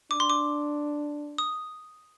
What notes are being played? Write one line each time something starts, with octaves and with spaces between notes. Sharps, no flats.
D4 D6
C6
D6
D#6